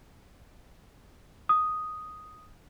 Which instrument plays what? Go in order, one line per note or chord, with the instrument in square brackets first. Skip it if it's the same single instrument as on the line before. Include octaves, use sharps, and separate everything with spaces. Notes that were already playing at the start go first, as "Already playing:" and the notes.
[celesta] D#6